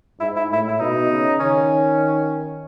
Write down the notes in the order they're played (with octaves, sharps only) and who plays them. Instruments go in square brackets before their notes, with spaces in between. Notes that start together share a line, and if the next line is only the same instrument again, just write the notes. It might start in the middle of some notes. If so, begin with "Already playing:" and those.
[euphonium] G#2 [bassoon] E4
[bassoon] E4
[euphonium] A2 [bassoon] E4
[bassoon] E4
[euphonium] B2 [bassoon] D#4
[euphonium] C#3
[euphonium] D#3 [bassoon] C#4